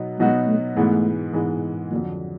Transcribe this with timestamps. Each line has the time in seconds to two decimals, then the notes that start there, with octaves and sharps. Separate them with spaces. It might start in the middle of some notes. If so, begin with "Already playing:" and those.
Already playing: B2 F#3 B3 D#4
0.19 B2 F#3 G#3 B3 D#4 F#4
0.47 A3
0.76 G#2 E3 G#3 A3 B3
1.33 G#2 E3 G#3 B3
1.91 F2 D3 F#3 A#3